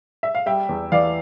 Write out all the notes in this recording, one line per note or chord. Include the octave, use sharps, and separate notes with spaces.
E5
F5
G3 E5 G5
E2
E3 D5 F5